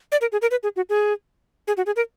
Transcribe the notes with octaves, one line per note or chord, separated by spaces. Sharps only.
D5
A#4
G#4
A#4
B4
G#4
F#4
G#4
G#4
F#4
G#4
A#4